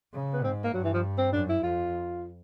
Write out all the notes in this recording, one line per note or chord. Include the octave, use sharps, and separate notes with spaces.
C#3
B3
G#2 C4
A#3
G2 F#3
E3
F3
C4
F#2 D4
E4
F2 F4